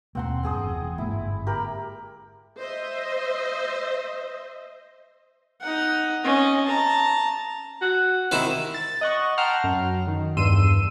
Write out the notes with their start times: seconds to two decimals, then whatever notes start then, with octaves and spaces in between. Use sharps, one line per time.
0.15 D#2 B2 A#3 C4 F#5 C6
0.43 E2 G2 C4 G#4 D#6
0.65 F1 E2
0.98 G1 G#2 A#3 E4
1.47 G4 A#4 B5
2.60 C5 D#5 E5
5.61 D#4 F#5
6.24 C#4 D#5
6.66 A5 A#5
7.82 F#4
8.32 C3 D#3 E4
8.74 A6
9.01 D#5 F#5 C#6
9.38 F#5 G5 A5 A#5 C6 F6
9.64 F#2
10.07 D#3
10.37 E2 G2 C6 E6 D#7